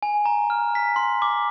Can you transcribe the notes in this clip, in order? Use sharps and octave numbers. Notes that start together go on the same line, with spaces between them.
G#5
A#5
F6
B6
C6
D6